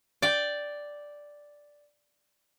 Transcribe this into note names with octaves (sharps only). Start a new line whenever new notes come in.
D5 G5